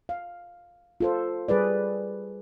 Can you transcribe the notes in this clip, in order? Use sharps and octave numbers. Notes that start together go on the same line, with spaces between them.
F5
F4 A4 C5
G3 G#4 B4 D5